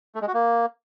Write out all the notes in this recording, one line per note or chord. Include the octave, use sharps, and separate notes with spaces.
A3
G#3
F#4
A#3